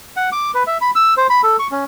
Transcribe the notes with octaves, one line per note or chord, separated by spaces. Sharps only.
F#5
D6
B4
E5
B5
E6
C5
B5
A4
C#6
C#4